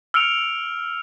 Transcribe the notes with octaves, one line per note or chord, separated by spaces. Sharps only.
E6 F6 C#7 D7 F7